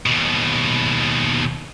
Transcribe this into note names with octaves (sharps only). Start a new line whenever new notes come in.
D#2 B2